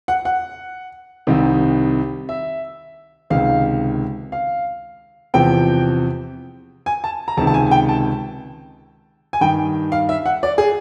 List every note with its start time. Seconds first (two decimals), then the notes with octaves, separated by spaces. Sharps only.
0.08 F#5
0.25 F#5
1.27 C2 C3 D#3
2.29 E5
3.30 C#2 C3 D#3 F5
4.32 F5
5.34 E2 C3 F3 G5
6.86 G#5
7.04 A5
7.28 A#5
7.37 C#2 C3 D#3 A5
7.47 A5
7.54 G#5
7.66 G#5
7.71 G5
7.89 A5
9.33 G#5
9.41 G2 D#3 G5
9.92 F5
10.09 E5
10.26 F#5
10.43 D5
10.58 G#4